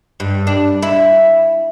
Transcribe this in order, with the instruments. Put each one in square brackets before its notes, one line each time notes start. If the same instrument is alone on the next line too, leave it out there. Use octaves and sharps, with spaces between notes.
[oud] G2
D4
E4